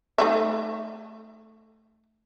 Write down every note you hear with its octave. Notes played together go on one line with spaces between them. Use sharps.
A3 D#4 E5